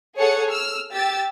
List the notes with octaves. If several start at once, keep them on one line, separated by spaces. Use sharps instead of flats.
G#4 A4 C#5 F#5 C#7
E6 F6
G4 E6 A6